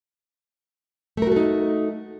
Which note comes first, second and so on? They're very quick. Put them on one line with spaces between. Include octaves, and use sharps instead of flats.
A3 A#4 F#4 A4 D#4